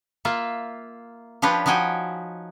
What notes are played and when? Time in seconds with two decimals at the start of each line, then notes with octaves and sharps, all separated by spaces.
0.25 A#3 F4 E5
1.42 F3 D4 G4 B4 C#5
1.66 F3 D#4 F#4 G5 G#5